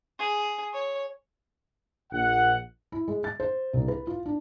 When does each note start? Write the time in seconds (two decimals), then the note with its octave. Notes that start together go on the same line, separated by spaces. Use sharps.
0.19 G#4
0.73 C#5
2.11 A#1 F#5
2.92 E4
3.08 G#3
3.24 A6
3.40 C5
3.73 C2
3.88 B4
4.07 F4
4.26 D4